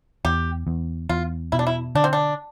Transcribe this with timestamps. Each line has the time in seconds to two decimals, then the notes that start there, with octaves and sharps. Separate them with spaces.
0.25 E2 G4
0.67 E2
1.09 E2 F4
1.52 B2 E4
1.59 D4
1.67 E4
1.95 D3 D4
2.04 C4
2.13 D4